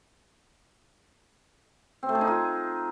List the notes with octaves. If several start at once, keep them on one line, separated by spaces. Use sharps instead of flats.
C4
A3
G#4
D#4
F4